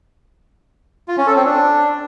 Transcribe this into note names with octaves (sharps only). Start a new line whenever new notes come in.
F4
C#4
A4
C4
D4